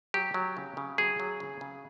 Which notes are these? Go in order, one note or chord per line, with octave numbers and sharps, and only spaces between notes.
F#3 G4
F#3
C#3
C#3
F#3 G#4
F#3
C#3
C#3